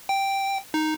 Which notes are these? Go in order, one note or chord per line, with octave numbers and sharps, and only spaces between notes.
G5
D#4